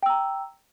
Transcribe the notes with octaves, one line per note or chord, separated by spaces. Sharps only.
G5 A#5 E6